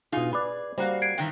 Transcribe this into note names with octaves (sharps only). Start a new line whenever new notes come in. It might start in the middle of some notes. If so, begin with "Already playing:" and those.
B2 D#4 F4 G#4
G#4 B4 D5
G3 A#3 F#4 C5 F5
G#6 C7 D7
G2 D#3 E3 G5